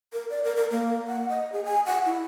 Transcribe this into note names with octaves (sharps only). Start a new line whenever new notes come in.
A#4
D5
A#4
A#4
A#3
F#5
D#5
G#4
G#5
F#5
E4